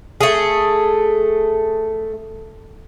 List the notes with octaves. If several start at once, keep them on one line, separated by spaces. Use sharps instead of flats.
A3 G#4